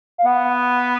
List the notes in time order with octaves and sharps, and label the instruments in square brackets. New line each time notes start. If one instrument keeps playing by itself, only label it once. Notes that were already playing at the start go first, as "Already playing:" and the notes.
[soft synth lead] F5
[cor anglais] B3 [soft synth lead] F#5